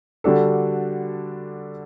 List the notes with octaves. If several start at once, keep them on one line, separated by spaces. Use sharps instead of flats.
D3 G3 D4 F#4 A4